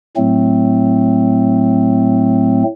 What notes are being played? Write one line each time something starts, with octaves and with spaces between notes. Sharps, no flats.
A2 F#3 A3 C4